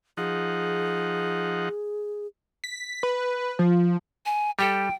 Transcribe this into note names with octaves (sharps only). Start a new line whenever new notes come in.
F3 D#4 G#4 F#5
B6
B4
F3
G#5
G3 G4 A4 G5